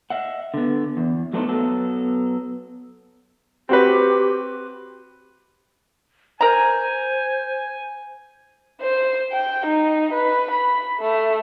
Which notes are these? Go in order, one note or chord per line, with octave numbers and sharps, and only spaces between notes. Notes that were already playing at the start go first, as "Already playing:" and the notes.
D#5 E5 F#5
D3 B3
E2
F#3 A3 B3 D4 D#4 C5
F#3 B3 A4
C4 F#4 G4 B4
A#4 C5 G#5 A#5
C5
G5
D#4
B4
B5
A3